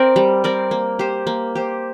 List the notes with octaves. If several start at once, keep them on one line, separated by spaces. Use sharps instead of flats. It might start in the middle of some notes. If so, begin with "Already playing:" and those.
Already playing: C4 A#4 D5
G3
C4 A#4 D5
A#3
G4 C5
A#3
G4 C5